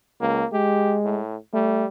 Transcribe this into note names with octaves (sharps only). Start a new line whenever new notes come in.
C#2 A#3
G#3 G4
A2
G3 A3